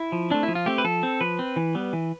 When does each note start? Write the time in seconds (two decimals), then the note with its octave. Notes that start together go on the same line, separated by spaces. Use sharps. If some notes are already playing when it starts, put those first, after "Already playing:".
Already playing: E4
0.12 F3
0.30 A3 C4 D4
0.43 F3 E4
0.55 F4
0.66 A3 C4 G4
0.78 B4
0.84 F3 A4
1.03 C4
1.21 F3 B4
1.39 C4
1.56 E3
1.75 G3 B3
1.93 E3